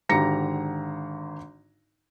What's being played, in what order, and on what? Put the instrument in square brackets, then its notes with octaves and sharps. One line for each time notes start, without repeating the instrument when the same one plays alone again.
[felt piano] G#1 D3 G4 A#5 A#6 C#7